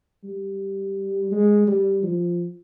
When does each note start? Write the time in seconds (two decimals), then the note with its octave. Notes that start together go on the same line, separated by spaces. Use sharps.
0.24 G3
1.32 G#3
1.67 G3
2.03 F3